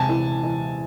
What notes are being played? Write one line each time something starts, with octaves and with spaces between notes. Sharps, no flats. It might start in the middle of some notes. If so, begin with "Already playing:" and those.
Already playing: C3 G#3 G#5 A5
E3
E3